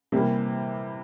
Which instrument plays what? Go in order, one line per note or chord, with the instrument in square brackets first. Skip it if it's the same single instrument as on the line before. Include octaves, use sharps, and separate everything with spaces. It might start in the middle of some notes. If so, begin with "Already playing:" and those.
[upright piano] C3 E3 G3 A#3